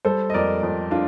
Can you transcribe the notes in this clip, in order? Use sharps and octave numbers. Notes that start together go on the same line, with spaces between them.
G3 A4 C5
D#5
F2 A#4 D5
F2
D4 F4